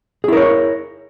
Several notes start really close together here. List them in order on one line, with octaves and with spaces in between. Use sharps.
G#4 E4 A#4 C#5